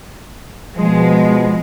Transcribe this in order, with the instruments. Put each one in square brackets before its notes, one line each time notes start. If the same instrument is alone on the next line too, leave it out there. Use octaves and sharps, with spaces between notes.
[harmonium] B2 [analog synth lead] F3 [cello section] G#3